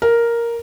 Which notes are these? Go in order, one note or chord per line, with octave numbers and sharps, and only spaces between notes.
A#4